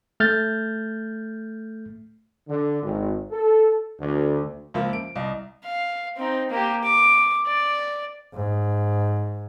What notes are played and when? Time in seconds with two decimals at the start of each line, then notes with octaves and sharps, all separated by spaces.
0.20 A3 F6 G6 A6
2.48 D3
2.83 G#1
3.31 A4
4.00 D2
4.74 C#2 F3 A#3 E5
4.93 D7
5.15 C2 D#5
5.65 F5
6.17 C4 D#4
6.50 A#3 G4
6.84 D6
7.47 D5
8.34 G#2